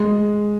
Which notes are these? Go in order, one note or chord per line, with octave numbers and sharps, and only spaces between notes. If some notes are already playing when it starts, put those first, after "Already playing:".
Already playing: G#3